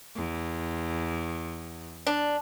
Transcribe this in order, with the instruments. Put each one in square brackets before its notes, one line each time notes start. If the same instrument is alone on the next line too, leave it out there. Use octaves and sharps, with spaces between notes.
[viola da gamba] E2
[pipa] D4